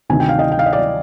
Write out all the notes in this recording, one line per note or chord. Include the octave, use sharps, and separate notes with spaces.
D2 C3 D#3 G#5
G5
F5
D#5 G5
G5
F5
D#5
D5 F5